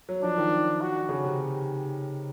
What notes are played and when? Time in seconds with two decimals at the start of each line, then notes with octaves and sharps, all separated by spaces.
0.09 F#3
0.23 F3 D4
0.38 D#3
0.81 F#4
1.09 C#3
1.24 C3